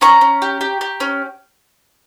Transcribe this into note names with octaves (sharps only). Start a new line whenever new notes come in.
C#4 A#5 C#6
C#4
G4
G4
G4
C#4